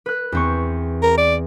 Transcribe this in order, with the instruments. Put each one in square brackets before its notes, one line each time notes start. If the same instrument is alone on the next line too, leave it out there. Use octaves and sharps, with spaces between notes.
[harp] B4 F#6
E2 C4 C#6
[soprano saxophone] A#4
D5